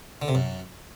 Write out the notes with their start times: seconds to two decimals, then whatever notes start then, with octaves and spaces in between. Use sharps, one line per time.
0.22 D3
0.28 C3
0.35 F#2